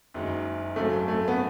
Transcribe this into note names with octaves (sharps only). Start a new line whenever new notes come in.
F#1 F#2 D#3 G#3
G#1 F#2 C#3 F#3 A3
A3
B3